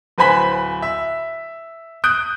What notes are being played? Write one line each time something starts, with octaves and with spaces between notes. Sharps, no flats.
D1 B4 C5 G#5 B5 B6
E5
D#6 F#6 G6 D7